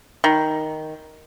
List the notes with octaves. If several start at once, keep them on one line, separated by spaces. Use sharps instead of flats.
D#3